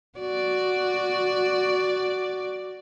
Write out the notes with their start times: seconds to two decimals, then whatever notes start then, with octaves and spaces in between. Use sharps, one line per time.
0.19 F#4 D5